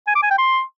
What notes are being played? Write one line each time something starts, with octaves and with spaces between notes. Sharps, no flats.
G#5
D6
G#5
G5
C6